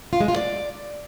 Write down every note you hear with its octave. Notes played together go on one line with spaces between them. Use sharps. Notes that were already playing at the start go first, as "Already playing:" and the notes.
F4
G#3
F4
D5